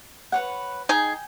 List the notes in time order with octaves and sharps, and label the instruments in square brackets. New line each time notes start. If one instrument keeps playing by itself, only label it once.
[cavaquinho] B4 C#5 F#5
[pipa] D#4 G#4 [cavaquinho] G5 G#5